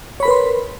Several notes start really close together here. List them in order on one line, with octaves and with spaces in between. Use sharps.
C#5 B5 A#4 B4 C6